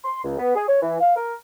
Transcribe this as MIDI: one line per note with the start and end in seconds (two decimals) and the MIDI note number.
0.04 0.21 84
0.24 0.37 37
0.38 0.54 59
0.55 0.64 68
0.68 0.79 73
0.82 0.98 52
1.00 1.12 77
1.16 1.35 70